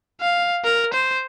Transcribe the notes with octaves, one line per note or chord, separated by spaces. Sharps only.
F5
A#4
C5